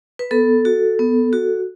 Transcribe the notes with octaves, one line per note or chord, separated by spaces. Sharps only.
B4
B3 A4
F#4
B3
F#4